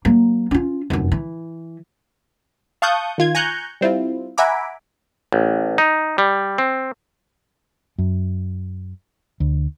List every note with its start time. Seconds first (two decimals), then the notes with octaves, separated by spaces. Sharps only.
0.05 F#3 A#3
0.51 C#4 F4
0.90 F1 F#2
1.12 E3
2.82 F5 A5 C#6 D#6 F#6 G6
3.18 D#3 F4 G#6
3.35 G#5 A#5 C#6 F#6 G6
3.81 G3 C4 E4 F4
4.38 E5 F#5 G#5 A#5 B5 D6
5.32 A1
5.78 D#4
6.18 G3
6.58 C4
7.98 F#2
9.40 D2